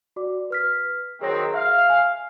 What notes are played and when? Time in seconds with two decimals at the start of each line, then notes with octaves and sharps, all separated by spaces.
0.16 F#4 D5 D6
0.50 B4 F6 B6
1.21 D#3 F#3 C4 G#4 C#5 A#6
1.54 E5 F5
1.90 G#5